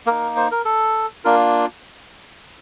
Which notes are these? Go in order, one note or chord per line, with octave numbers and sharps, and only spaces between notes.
A#3 D#4 A#4
C5
A#4
A4
A#3 D4 F4 A#4